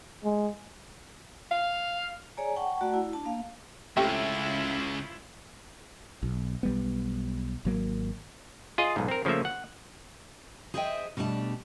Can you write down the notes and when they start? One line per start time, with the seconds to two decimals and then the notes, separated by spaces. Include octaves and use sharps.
0.24 G#3
1.51 F5
2.37 G#4 C#5 D5 G#5 A#5
2.56 F#5 G5 A5 C#6
2.81 A3 F#4 D5 F#5 A5 A#5
2.94 E4
3.13 D4 A5
3.25 A#3 F5
3.97 C#2 A3 C4 C#4 E4 F4 G4 E5
6.23 B1
6.63 B1 G3 B3
7.65 G#1 F#3 A#3
8.78 F4 G#4 D#5
8.96 B1 G#2
9.08 C4 A#4
9.25 C#3 F3 A3 A#3 E5
9.45 F#5
10.74 G#4 C5 D#5 E5 F#5 G5
11.17 B2 G3 A3 D4 A5